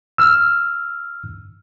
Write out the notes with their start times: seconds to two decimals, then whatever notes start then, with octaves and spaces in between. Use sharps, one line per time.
0.18 E6 F6